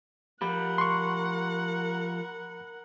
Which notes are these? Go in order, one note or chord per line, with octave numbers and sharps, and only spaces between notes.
F3 G4 A#4 F#5 B5
C6 C#6